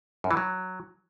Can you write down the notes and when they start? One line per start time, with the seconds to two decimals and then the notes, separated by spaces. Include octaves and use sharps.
0.24 F#2
0.31 E3
0.37 F#3